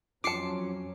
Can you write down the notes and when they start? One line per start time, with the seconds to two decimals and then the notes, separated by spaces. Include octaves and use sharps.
0.24 F2 F#3 C#4 F4 A5 D6 C7 C#7